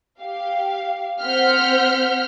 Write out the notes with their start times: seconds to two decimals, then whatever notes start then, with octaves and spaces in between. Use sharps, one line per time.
0.21 G4 F5
1.23 C4 C5 F#5 F6 G6 B6